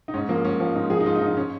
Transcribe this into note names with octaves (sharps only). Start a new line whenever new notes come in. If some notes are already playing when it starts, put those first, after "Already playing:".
D#4
G#2 C#4
F3 A#3
G#2 C#4
F3 F4
G#2 D#4
F3 G#4
D#4
G#2 F4
D#4
F3
D#4
C#4